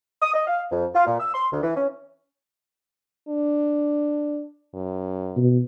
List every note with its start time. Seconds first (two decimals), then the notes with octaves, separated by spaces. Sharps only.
0.22 D#6
0.34 D#5
0.47 F5
0.71 F2
0.95 F4
1.06 A#2
1.20 E6
1.34 C6
1.51 D2
1.63 E3
1.76 C#4
3.28 D4
4.74 F#2
5.36 B2